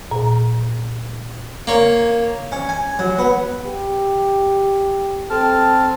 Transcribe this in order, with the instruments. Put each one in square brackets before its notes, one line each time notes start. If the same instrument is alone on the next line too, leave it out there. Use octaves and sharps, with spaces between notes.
[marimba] A#2
[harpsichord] A#3 C#5
C#4
G#5
F#3
B3
[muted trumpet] G4
[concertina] C4 A5 F6 [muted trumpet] A4